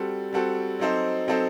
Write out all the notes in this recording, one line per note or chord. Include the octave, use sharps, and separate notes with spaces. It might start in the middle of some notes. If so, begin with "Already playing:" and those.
Already playing: G3 C4 F#4 A4
G3 C4 F#4 A4
F#3 C4 D#4 A4 C5
F#3 C4 D#4 A4 C5